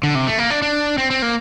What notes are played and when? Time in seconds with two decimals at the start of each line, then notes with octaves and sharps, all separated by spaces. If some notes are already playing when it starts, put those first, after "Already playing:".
0.03 D3
0.15 C3
0.27 A3
0.39 A#3
0.50 D4
0.62 D4
0.98 C4
1.11 C4
1.22 A#3